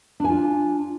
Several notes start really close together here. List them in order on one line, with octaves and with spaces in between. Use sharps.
D4 G#5 F4